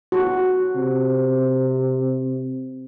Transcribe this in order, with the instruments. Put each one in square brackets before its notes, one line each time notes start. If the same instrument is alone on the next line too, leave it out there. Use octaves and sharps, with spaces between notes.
[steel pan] F#4
[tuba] C3